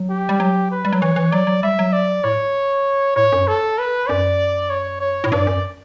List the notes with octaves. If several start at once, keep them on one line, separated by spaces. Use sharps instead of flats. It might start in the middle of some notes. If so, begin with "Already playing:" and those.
Already playing: F#3
G4
G3
F#3
B4
G3
F#3
E3 C#5
E3
F#3 D5
F#3
G3 E5
F#3
D5
A2 C#5
A2 C#5
F#2
A4
B4
F#2 D5
C#5
C#5
A2
G2 D5
F#2